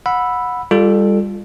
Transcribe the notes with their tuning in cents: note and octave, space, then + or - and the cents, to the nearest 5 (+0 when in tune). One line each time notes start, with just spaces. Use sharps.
F#5 -20 B5 +0 E6 +0
G3 +30 F4 +0 A4 +0